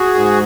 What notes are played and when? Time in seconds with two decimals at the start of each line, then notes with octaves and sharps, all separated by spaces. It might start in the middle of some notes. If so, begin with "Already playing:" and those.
Already playing: F#4 G#4
0.14 G#2